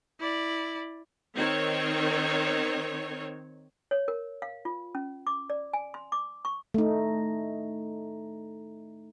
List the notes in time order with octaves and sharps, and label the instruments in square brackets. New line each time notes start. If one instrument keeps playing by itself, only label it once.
[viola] E4 D5
[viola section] D#3 C4 C#5
[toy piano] C#5
A#4
F5
F4
C#4
D6
D5
G#5
C6
D6
C#6
[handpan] A3 D#4